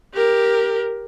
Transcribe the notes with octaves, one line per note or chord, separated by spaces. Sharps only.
G4 A#4